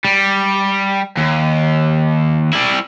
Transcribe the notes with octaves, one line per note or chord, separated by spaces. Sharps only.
G3
D#2
G3 E4